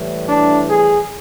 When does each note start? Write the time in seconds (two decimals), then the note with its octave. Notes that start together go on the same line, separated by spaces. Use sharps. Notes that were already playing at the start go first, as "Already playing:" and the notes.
Already playing: A2 E3 G3
0.28 D4
0.68 G#4